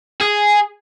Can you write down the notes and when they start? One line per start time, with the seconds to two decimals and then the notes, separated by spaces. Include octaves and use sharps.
0.21 G#4